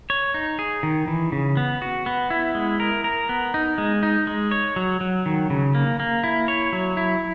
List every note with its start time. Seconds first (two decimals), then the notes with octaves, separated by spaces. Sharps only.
0.10 C#5
0.34 D#4
0.59 G#4
0.83 D#3
1.08 E3
1.32 C#3
1.57 B3
1.82 F#4
2.06 B3
2.30 E4
2.55 G#3
2.80 A#4
3.04 A#4
3.29 B3
3.54 D#4
3.78 G#3
4.03 D#4
4.27 G#3
4.51 C#5
4.76 F#3
5.01 F#3
5.26 D#3
5.50 C#3
5.75 A#3
6.00 A#3
6.24 E4
6.48 C#5
6.73 F#3
6.97 E4